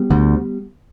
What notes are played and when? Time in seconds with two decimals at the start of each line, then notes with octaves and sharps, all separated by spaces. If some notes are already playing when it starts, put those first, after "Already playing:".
Already playing: G3 B3
0.10 D2 D3